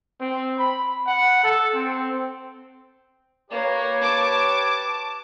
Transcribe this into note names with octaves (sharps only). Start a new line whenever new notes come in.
C4
B5
F#5
A4
C4
A#3 G4 B4 C#5
A5 D6